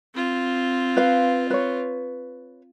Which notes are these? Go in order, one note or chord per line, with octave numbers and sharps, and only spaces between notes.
C4 F4
B4 F5
B4 C#5